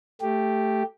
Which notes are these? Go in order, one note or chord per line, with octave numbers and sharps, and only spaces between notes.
A3 G4